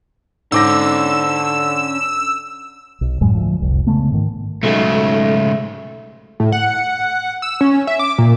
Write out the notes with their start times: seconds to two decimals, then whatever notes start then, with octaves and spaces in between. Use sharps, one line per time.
0.52 G#2 D3 C#4 C5 D6 E6 A#6
3.01 B1
3.21 F#2 A2 F#3 G#3
3.34 D2 F3
3.61 F1 C2
3.87 C#3 G#3 A3 B3
4.12 G#2 D#3
4.63 B1 G#2 C#3 G#3 A3 A4
6.40 A2
6.52 F#5
7.42 E6
7.61 C#4
7.87 E5
7.99 D6
8.18 A#2